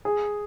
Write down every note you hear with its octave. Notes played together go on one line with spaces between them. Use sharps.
G#4